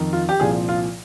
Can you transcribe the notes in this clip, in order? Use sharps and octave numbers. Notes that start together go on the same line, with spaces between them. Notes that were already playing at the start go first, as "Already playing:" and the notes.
Already playing: F2 D#3
F4
G4
C2 A#2 F3 G#4
F4